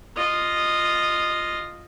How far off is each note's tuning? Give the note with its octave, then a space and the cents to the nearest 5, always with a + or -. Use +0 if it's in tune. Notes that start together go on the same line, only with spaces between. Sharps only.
F4 +0 D#5 -10